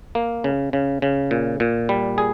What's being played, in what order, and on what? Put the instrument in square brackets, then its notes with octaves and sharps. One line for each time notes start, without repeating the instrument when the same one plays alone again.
[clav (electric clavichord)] A#3
C#3
C#3
C#3
A#2
A#2
G3
G#4